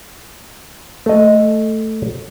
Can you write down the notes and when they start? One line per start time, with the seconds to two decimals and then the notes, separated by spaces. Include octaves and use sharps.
1.06 A3 D#5